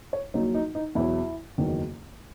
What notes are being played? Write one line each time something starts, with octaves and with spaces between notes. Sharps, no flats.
C#5
A#1 A#2 F#3 D#4
D#4
D#4
E2 B2 F#3 E4
F#1 E2 D#3 F#3